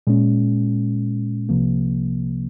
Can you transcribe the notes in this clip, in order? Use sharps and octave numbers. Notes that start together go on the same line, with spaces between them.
A#2 G#3 C#4
C2 C3 F3 A#3